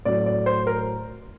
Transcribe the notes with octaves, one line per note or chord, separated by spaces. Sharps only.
A2 F#3 D5
D5
C5
A#4